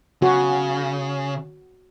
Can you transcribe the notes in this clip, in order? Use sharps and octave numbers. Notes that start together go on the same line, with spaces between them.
C#3 F#4